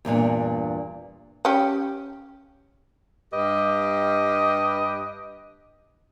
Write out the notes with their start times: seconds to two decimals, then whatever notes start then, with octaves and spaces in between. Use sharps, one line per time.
0.05 E2 G2 A#2 D4
1.45 C#4 G4
3.33 G2 G4 B4 D#5